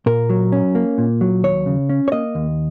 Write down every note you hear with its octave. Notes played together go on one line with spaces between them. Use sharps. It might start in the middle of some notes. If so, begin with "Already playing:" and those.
A#2 A#4
F#3
C#4
A#3
A#2
F#3
D#2 C#5
C#3
C#4
C#5
A#3 D#5
D#2